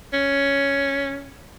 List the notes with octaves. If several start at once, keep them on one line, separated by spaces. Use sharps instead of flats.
C#4